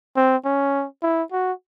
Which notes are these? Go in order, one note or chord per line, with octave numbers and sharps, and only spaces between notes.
C4
C#4
E4
F#4